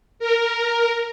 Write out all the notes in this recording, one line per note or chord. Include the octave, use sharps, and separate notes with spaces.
A#4